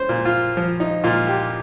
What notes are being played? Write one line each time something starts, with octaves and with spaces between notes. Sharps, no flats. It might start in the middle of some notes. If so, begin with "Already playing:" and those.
Already playing: C#4 C5
A#2
F4
F3
D#4
A#2 F4
G4